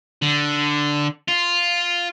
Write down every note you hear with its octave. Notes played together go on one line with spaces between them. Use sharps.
D3
F4